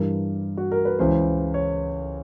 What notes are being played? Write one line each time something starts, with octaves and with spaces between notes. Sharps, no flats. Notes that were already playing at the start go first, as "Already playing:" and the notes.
Already playing: G2 E3 A#4
F#4
A#4
B4
C#2 C#3 E3 C5
C#5